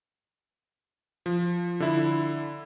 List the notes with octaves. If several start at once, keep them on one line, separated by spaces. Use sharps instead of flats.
F3
D3 E4